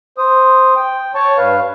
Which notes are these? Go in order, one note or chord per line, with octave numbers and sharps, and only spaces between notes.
C5 D#6
G5
C#5 A5 C#6
G2 B4 F5